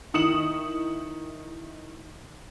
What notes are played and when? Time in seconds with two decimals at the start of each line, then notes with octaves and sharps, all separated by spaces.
0.14 D#3 E4 D#6 C#7 E7 F#7